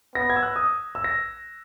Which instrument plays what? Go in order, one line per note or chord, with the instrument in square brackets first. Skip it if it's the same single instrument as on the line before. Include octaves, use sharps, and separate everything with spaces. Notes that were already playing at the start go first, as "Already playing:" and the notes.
[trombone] B3 [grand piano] A#6
[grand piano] G#6
E6
F#6
D#6
E6
A#6